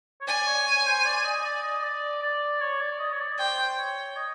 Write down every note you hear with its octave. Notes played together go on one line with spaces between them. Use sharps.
C#5
D5 G#5
C#5
C#5
C5
D5
D#5
D5
D#5
D5
D5
C#5
D5
D#5
C#5
D5
C5 G5
C#5
D#5